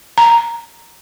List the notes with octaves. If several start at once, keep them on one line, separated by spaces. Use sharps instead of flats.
A#5